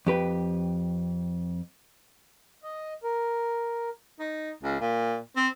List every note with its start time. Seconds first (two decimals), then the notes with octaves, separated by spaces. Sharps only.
0.07 F2 G4 B4 G5
2.63 D#5
3.04 A#4
4.19 D#4
4.63 C#2
4.80 A#2
5.36 C4